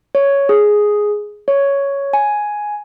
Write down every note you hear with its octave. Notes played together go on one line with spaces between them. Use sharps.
C#5
G#4
C#5
G#5